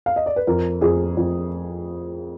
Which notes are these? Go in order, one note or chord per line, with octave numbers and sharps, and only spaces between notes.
F5
D#5
D5
B4
F2 A#4
F2 G#4
F2